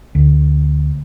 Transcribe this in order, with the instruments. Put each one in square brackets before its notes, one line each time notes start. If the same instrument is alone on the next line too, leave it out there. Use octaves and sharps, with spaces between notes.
[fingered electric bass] D2